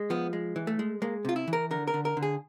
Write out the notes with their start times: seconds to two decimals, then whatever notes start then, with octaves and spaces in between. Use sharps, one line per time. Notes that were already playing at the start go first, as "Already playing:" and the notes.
Already playing: G#3
0.10 F3 B3
0.33 G#3
0.56 E3
0.67 A3
0.79 G#3
1.02 G#3 A#3
1.25 C3 F4
1.36 E4
1.48 E3
1.53 A#4
1.71 D3 A#4
1.87 A#4
1.94 D3
2.05 A#4
2.17 D3
2.22 G#4